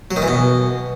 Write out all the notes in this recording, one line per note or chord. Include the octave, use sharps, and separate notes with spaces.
F#3
D#3
E3
B2